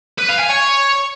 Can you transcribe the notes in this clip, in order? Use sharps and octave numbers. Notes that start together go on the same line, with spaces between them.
B4
F5
G#5
C#5